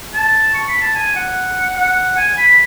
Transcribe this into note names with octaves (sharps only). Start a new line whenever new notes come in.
A5
C#6
B5
A5
G#5
F#5
F#5
G#5
B5